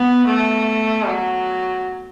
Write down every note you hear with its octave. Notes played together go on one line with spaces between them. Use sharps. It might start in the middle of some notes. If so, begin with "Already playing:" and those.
Already playing: B3
A3
F#3